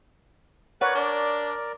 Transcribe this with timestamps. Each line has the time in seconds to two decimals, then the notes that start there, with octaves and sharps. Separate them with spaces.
0.81 A#4 B4 C#5 D5 F#5
0.95 D4